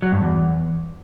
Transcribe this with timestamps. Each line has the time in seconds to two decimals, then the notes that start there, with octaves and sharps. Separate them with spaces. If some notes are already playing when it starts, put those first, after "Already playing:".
0.02 F#3
0.12 G2
0.22 E2